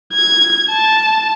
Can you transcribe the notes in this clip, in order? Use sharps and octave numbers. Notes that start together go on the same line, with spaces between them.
G#6
A5